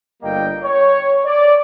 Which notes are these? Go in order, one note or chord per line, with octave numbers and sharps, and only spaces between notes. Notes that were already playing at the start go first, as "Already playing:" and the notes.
G1 G3 A#3 D#5 G5
C#5
D5